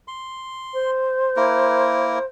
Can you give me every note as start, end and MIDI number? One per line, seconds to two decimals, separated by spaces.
0.08 0.91 84
0.73 2.26 72
1.36 2.19 58
1.36 2.19 64
1.36 2.19 70